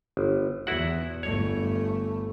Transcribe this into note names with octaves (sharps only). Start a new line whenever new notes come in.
G1
E2 E4 F#4 F#5
G1 A3 C#5